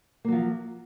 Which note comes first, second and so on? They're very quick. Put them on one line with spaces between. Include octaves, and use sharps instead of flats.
A#3 F#3 F3